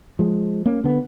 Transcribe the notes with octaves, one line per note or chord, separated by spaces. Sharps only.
F3 G#3
A#3 C#4
D3 B3